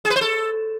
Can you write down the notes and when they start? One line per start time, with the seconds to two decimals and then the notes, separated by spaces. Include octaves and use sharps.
0.05 G#4
0.10 B4
0.16 C5
0.21 A4